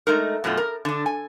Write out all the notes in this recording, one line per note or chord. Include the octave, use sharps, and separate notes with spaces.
G#3 A3 D#4 A#4
F#2 B2 A3 C#4 F4
A#4
D3 D4
G#5